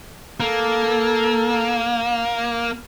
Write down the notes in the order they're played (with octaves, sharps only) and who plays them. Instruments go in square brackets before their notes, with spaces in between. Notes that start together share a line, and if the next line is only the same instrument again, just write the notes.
[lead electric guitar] A#3 [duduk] A4